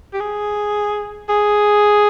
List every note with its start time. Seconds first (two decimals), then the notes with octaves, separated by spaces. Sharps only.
0.13 G4
0.20 G#4
1.29 G#4